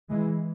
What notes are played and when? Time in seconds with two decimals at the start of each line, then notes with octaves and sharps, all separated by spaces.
0.10 E3 G#3